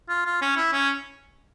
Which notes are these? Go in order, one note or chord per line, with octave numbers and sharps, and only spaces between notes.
F4
F4
C#4
E4
C#4